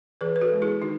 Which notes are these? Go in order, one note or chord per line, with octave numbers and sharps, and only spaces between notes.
E3 G#4 B4
B4
F#4 A4
G#3 B3
E4 G#4
D#3 D#4 F#4